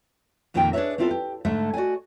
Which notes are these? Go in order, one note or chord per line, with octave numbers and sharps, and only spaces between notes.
F2 A#2 D#3 A#3 A#4 G5
D4 G#4 A#4 B4 C#5 E5
B3 C4 E4 F4 G#4 A4
G4
G#2 D3 A3 E5
F#4 D5 D#5 G#5